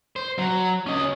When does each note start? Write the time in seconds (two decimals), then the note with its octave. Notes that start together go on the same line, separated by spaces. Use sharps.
0.16 C5
0.38 F#3
0.86 C#4 D#5